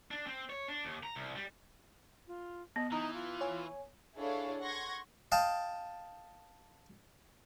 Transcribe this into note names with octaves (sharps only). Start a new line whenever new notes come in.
D4
C4
C#5
D4
D#2
A#5
C2
G3
F4
B3 D#5
E3 D#4 A#5
F4
C#5 G#5
D4 E4 G#4 A4 C#5 F5
F#5 C6 C#6 G#6 A#6
D#5 F5 G5 A5